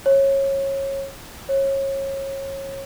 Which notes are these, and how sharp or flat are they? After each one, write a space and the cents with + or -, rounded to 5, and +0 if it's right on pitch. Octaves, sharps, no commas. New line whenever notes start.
C#5 -20
C#5 -25